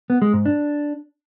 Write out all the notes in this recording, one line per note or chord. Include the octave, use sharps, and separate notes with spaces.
B3
G#3
G#2
D4